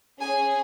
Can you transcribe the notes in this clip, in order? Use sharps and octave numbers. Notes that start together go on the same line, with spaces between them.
C#4 G#4 G#5